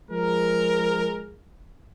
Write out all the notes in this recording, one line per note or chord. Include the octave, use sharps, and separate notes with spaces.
F3 G#3 A#4